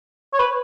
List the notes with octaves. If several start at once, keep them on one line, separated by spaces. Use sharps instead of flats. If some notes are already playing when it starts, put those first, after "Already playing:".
C#5
B4